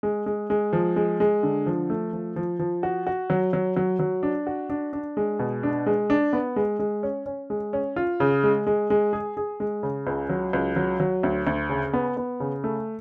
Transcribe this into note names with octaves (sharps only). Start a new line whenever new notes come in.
G#3
G#3
G#3
F3
G#3
G#3
D3
F3
A3
F3
F3
F3
F#4
F#4
F#3
F#3
F#3
F#3
D4
F#4
D4
D4
G#3
B2
D4
G#3
D4
B3
G#3
G#3
C#4
C#4
G#3
C#4
F4
C#3
G#3
G#3
G#3
G#4
G#4
G#3
C#3
C#2
F#3
C#2
F#3
F#3
D2
D2
C#3
B3
B3
C#3
A3